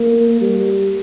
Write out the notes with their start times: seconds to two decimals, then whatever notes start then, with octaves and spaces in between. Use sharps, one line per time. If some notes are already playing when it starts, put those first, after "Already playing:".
Already playing: A#3
0.41 G3